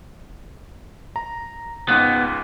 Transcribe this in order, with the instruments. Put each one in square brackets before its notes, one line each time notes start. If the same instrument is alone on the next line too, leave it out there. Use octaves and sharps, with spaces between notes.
[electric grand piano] A#5
[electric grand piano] C#2 G#2 [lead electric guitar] B3